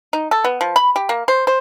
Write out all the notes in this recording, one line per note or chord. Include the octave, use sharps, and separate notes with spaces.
D#4
A4
B3
F3
B5
G4
A#3
C5
C5